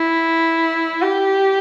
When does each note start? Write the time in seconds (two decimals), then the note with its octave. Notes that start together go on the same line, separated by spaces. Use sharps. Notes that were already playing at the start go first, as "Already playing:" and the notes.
Already playing: E4
1.02 G4